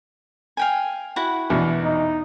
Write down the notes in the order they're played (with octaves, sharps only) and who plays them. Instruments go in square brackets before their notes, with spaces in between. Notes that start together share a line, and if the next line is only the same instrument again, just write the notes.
[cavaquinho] F5 G5 G#5
E4 F#4 F#5
[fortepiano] E2 B2 D4
[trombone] D#4